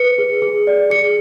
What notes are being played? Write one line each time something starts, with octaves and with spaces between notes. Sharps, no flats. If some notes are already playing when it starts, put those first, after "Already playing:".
Already playing: B4 C#7
G#4
G#4
D5
G#4 C#7